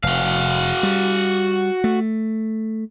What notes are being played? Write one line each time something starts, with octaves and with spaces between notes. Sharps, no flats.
F1 F#4 F5
G3
A3